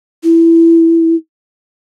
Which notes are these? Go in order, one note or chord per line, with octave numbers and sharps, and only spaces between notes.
E4